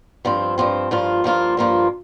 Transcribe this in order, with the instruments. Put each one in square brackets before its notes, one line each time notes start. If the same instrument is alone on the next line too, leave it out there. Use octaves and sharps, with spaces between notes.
[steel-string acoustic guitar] G2 F3 C4
G2 F3 C4
G2 F3 A#3 F4
G2 F3 A#3 F4
G2 F3 A#3 F4